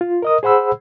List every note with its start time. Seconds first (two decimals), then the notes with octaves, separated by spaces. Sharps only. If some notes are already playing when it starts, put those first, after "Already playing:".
0.01 F4
0.22 A#4 D#5 D#6
0.43 G#4 C5 F#5 B5 E6